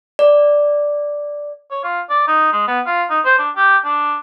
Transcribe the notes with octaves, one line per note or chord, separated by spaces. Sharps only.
D5
C#5
F4
D5
D#4
G#3
B3
F4
D#4
C5
D4
G4
D4